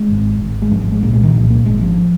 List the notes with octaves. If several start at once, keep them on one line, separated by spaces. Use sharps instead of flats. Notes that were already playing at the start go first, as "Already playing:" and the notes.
Already playing: G#3
G#1 G#2
G#1 G#2
G#3
G#1 G#2 F3
F3
G#3
C2 A#2 A#3
G#3
D#3
C2 A#2 F3
A#3
G#1 G#2 G#3
F3